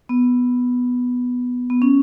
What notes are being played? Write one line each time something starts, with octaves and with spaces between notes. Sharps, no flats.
B3
B3
C#4